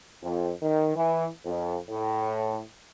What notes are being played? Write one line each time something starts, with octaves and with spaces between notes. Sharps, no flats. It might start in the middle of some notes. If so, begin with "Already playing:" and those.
F2
D#3
E3
F2
A2